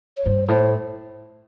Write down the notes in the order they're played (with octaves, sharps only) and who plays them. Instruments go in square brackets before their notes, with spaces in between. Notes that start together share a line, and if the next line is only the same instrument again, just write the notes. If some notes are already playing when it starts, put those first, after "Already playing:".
[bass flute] C#5
[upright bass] G2 [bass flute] C5
[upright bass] A2 [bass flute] C5